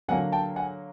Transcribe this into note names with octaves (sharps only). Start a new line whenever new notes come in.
D3 F#3 A#3 F#5 G#5
G5 A5
F#5 G#5